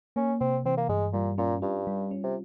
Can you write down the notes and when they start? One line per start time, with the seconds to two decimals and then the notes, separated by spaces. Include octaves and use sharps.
0.16 A#3 C#4
0.41 C3 C4
0.65 E3 C4
0.78 A#3
0.89 G2 G#3
1.13 A#2 G3
1.38 A#2 C#4
1.62 G2 F4
1.87 G3
2.11 C#4
2.24 C3